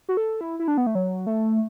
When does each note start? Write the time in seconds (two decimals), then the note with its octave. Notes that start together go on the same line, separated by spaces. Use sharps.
0.09 F#4
0.17 A4
0.41 E4
0.60 E4
0.68 D4
0.78 B3
0.87 A3
0.95 F#3
1.27 A3